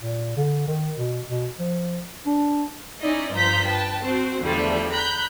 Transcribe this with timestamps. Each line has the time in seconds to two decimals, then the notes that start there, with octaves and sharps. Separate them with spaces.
0.02 A#2
0.37 D3
0.68 D#3
0.98 B2
1.27 B2
1.59 F3
2.26 D4
3.00 C#4 D#4 E4 D5 D#5
3.33 G2 F3 C5 A#5 G6 B6
3.65 B4 G5 A5
4.02 C4 F#4 C5
4.40 E2 D3 F3 G3 A3
4.91 A#5 B5 F#6 G6